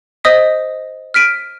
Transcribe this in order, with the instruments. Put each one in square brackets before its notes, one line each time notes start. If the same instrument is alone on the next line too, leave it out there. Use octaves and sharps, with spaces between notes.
[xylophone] C5 D#5 D#6 B6
F6 B6 D7 D#7